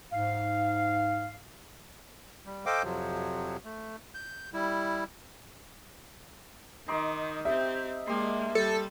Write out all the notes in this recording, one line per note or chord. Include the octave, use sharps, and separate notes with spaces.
G#2 F5
G3
A4 C5 D#5 F5 G5 D6
F2 C3 F3 F#3
A3
G6
G3 E4
D#3 D#4 C6 D6
C4 G4 E5
G#3 A#3 D4 G4 C6
G3 A4